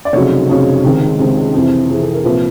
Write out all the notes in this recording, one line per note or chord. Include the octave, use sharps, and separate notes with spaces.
D5
F1 F2 C#3 F#3 C#5
F1 F2 C#3 F#3
C#2 C3 D#3 G#3
C#2 C3 D#3 G#3
F2 C3 E3
F2 C3 E3 G#4
A4
A#4
C2 A#2 F3 B4